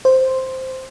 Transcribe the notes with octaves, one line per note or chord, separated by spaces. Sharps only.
C5